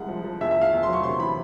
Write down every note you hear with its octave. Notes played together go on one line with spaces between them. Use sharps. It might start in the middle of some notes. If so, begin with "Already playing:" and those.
Already playing: C2 G#3 F#5
F3
F3
E2 E5
E5
E2
F5
E2
C6
F#3
C#6
C3 C6
E3 B5